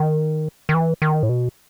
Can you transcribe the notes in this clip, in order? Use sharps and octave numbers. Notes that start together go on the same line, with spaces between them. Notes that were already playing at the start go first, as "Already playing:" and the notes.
Already playing: D#3
D#3
E3
D#3
A2
B2